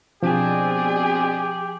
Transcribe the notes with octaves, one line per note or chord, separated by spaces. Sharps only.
B2 F3 C4 D4 G4 G#4